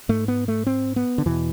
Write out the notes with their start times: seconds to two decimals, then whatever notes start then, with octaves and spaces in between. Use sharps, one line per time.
0.09 G#2 A3
0.28 B3
0.48 A3
0.67 C4
0.96 B3
1.18 D3
1.25 E2 B2 E3